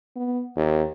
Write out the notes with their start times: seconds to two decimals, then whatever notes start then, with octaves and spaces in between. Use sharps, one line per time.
0.16 B3
0.56 D#2